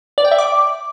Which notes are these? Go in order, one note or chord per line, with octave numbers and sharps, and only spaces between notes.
D5
G5
E5
D6